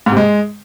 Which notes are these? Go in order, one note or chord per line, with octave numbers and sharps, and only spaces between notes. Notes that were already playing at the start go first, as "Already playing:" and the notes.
G#2
C3
G#3